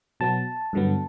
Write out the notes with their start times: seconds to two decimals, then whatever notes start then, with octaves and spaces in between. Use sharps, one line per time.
0.20 B2 F#3 B3 A5
0.73 G2 D3 F#3 B3